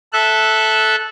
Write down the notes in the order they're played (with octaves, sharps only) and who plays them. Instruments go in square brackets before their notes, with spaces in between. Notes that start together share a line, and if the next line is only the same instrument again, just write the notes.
[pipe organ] A4 E5 F#6